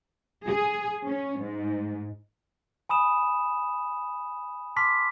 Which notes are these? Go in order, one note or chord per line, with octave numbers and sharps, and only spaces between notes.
G#4
C#4
G#2
G#5 B5 D#6 E7
A5 C6 D6 F6 B6